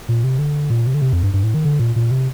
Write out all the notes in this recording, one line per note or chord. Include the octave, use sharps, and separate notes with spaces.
A#2
C3
D3
A#2
C3
D3
C3
F2
G2
G2
A2
D#3
D3
A#2
A#2
C3